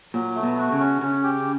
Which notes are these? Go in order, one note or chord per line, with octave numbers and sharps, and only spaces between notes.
A#2 F#3
A3
B2
F#4
C#3
C#4
C#3 C#4
G4